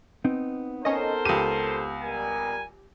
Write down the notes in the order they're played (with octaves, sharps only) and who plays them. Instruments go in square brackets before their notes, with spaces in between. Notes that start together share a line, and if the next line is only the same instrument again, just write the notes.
[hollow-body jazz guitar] B3 C4 D#4
[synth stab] C#4 D#5 [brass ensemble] A4 A#4 C5
[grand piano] C#2 D#7 [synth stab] G4
[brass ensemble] G3 A#4 G#5